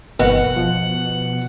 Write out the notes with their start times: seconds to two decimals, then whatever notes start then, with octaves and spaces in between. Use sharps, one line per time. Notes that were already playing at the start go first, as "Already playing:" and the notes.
0.20 G1 B2 D#3 B3 F#4 F#5
0.56 F3